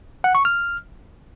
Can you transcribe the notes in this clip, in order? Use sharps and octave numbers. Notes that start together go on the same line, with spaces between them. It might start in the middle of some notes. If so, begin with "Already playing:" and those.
F#5
C#6
F6